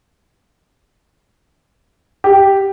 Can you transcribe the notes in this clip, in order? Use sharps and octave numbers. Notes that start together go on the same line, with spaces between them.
G4